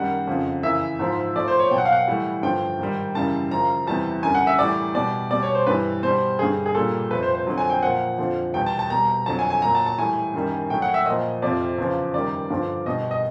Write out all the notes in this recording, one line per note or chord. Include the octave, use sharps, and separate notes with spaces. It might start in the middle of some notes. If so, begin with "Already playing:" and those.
Already playing: F#2 D#3 G3 F#5
F2 C#3 F3
F#2 C#3 E3 E5
G#2 F3
A2 F3 D5
C5
C#5
B2 F#3 F#5 G5
F5
F#5
A2 E3 G3
G2 D3 F3 G5
G#2 D#3 G3
F#2 C#3 E3 G3 A5
F#2 C#3 F3 A#5
E2 C3 E3 G3 A5
F#2 D3 G3 G#5
F#5
E5
A2 E3 G3 D5
B2 G3 D5
B2 G3 D5
C#5
C5
G2 E3 G3 B4
B2 G3 C5
G2 D3 G3 G#4
G#4
A#2 G3 A4
F2 C3 F3 B4
C5
C5
F2 D3 F#3
G#5
G5
A#2 F3 F#5
F2 D3 F3
E2 B2 G3 G5
A5
A5
B2 G3 A#5
F2 D3 F#3 A5
G#5
G#5
A#2 F#3 A#5
A5
A5
A2 E3 G3 G#5
F#2 D#3 G3
A2 F#3 G5
F#5
E5
A#2 F3 D#5
F2 C3 F3 D5
E2 C#3 F3
F#2 D#3 G3 D5
G2 D3 F3
B2 G3 D#5
D#5